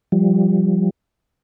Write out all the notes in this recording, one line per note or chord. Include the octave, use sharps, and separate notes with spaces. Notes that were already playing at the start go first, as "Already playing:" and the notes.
F3 G3